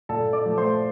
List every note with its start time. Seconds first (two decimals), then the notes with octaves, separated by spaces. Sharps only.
0.09 A#2 A4 A5
0.33 D5 D6
0.45 F3 A3
0.57 C5 C6